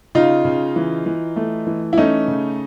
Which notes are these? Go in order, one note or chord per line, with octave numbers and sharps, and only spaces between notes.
C#3 D#4 F4
C#3
E3
E3
A3
E3
E4
A3 C#4 D#4
C#3